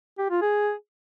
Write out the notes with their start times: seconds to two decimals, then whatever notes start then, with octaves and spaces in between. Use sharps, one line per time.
0.18 G4
0.30 F4
0.41 G#4